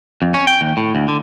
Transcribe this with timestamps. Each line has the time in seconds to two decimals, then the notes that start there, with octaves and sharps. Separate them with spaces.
0.22 F2
0.34 C#4
0.47 G5
0.61 D#2
0.77 A2
0.95 D2
1.08 D3